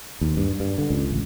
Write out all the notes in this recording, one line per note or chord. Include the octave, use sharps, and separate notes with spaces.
D#2
G2
G2
D3
C#2
A1